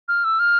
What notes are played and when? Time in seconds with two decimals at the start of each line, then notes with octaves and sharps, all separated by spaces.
0.08 F6
0.24 E6
0.39 F6